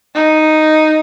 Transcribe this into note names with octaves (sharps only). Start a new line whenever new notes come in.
D#4